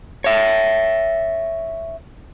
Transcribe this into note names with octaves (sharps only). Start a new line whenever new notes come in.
C#5 E5